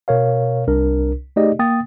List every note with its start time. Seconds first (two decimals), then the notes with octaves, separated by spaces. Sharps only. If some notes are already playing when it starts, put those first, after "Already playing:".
0.08 B2 A#4 C#5 F5
0.67 C2 D4 A#4
1.36 A3 D#4 G4 G#4 D5 D#5
1.59 A#3 G5 D#6 A6